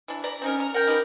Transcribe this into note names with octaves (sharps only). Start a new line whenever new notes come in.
E3 D4
B4 D5 A#5
C4 C#4 D#4 A#4
A#5
A#4 F#5 G5
D#4 G4 B4